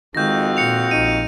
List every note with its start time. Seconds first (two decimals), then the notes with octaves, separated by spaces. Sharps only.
0.15 F2 D#3 G#3 F#4 G6 A#6
0.57 A#2 C#7 F7
0.91 A#1 D#4 D#7